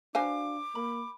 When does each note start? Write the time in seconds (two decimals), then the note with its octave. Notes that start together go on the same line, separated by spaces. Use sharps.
0.15 D4 F#4 B4 C5 F5 G#5 D6
0.75 A#3 B5